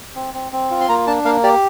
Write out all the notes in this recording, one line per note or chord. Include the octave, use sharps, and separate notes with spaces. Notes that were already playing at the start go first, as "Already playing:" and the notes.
C4
C4
C4
F4
C6
A#3 A#5
D4 A5
A#3 F5
G4 D5